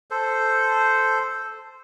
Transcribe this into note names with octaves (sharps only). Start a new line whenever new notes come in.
A4 C5